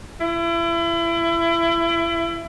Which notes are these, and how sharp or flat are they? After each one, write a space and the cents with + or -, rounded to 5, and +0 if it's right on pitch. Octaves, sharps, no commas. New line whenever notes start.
E4 +30